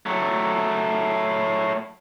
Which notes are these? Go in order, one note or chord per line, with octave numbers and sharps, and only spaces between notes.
F#3 A3